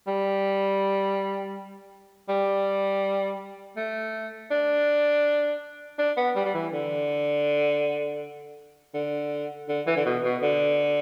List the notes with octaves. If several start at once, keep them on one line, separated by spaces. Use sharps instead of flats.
G3
G3
A3
D4
D4
B3
G3
G3
E3
D3
D3
D3
E3
D3
B2
B2
D3